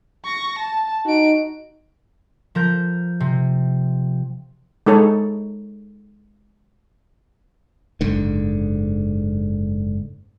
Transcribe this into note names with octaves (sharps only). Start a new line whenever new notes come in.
C#6 A#6
A5
D#4 F#4 D7
F3 A#4 G6
C3
G#3 D#4 A4 C#5
F#1 G#2 D3